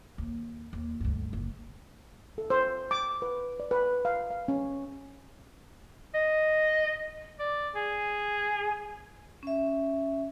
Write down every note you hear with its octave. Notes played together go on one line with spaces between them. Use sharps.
D#2
D#2
D2 G2
F#1
A4
C5
D6
B4
D5
B4
F5
F5
C#4
D#5
D5
G#4
C#4 E5